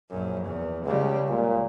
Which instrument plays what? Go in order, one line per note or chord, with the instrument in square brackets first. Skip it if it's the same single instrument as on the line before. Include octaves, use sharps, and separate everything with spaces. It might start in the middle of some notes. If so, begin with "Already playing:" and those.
[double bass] A#1 F#2
E2
[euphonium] C#2 [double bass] C#3 G3
[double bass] C#2 [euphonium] A#2